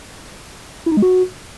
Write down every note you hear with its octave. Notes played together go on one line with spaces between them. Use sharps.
E4
D#4
G#3
F#4